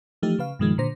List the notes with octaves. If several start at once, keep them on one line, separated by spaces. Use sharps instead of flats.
E3 F3 A3 D#4 G4
C#3 B4 F5
G2 B2 D#3 F3 G#3
A#2 D3 C5 A#6